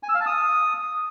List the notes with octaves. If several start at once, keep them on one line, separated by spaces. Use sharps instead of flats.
G#5
E6
F5
A5
D#6